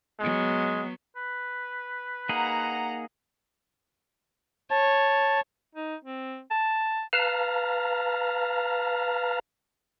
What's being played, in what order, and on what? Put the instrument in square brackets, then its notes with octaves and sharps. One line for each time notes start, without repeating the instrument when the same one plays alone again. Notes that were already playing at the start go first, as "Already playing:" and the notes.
[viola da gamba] F#3 B3 [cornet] G#3
[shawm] B4
[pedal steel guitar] A#3 D#4 G#4 [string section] F#5 A#5
[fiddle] C#5 [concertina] A5
[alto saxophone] D#4
C4
A5
[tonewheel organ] B4 F5 A5 A#5 F6